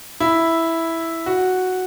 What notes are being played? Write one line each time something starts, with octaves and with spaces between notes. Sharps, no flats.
E4
F#4